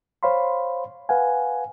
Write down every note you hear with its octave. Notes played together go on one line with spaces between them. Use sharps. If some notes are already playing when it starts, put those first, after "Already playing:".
C5 C#5 F5 B5 C6
B4 F5 F#5 G#5